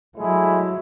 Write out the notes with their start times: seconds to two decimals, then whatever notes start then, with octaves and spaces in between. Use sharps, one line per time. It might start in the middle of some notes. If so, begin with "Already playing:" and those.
0.17 F#3 G#3 A3 E4